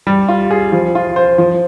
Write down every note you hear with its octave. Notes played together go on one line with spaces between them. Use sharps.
G3
F4
G#4
F3
F4
C5
F3